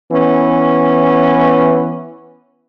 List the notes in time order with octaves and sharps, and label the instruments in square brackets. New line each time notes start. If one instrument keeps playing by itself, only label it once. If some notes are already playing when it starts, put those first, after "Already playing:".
[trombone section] E3 B3 C#4